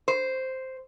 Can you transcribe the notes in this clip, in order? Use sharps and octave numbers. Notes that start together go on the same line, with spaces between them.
C5